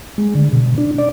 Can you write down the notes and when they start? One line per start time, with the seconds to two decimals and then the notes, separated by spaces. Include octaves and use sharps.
0.18 G#3
0.35 D3
0.53 B2
0.78 D4
0.98 D5